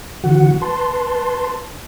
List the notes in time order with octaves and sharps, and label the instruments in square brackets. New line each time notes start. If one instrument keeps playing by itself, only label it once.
[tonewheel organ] D3 E3 F#4 F#5
B4 A5 C6